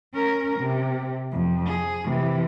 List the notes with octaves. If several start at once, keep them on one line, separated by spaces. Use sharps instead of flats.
C#4 A#4
C3
F2
G#4
C3 E3